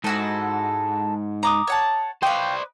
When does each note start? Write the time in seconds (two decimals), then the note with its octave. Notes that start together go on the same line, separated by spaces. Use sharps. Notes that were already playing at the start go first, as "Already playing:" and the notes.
0.04 G#2 E4 F#4 A4
1.43 A#5 D6 D#6
1.67 C#5 F#5 A5
2.23 B4 C5 D5 D#5 F5 G5